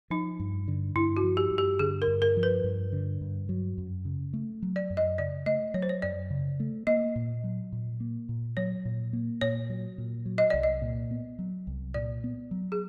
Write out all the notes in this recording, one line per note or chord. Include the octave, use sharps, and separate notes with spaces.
F3 D#4
G2
D3
G2 E4
F#4
F3
G4
G2
G4
D3 G#4
A#4
G2
A#4
F3
B4
G2
D3
G2
F#3
F#2
C#3
A3
F#3
D5
F#2
D#5
C#3 D5
A3 D#5
F#3 C#5
C5
C#5
F#2 D5
C#3
A3
A#3 D#5
A#2
F#3
A#2
A#3
A#2
F#3 C#5
A#2
A#3
A#2 C#5
F#3
A#2
F#3
D#5
C2 D5
D#5
A#2
B3
F#3
C2
A#2 D5
B3
F#3
G#4